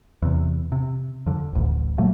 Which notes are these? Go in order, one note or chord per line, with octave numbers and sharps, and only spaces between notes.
E2 C3
C3
F2 D3
D1 A1 D2
A#2 F#3 A3 A#3